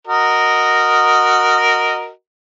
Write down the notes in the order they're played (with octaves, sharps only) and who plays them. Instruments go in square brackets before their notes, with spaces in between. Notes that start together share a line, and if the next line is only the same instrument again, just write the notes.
[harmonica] F#4 A#4 D#5